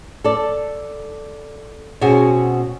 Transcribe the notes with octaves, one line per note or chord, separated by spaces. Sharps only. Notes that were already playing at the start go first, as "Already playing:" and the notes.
A4 D5
B2 C4 C#4 F#4 G#4